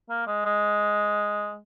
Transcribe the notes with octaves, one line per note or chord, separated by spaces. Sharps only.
A#3
G#3
G#3